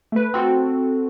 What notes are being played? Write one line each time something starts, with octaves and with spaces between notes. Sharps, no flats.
A3 B4
C4 F#4 A4